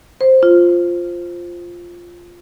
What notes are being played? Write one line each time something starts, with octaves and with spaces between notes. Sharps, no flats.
C5
F4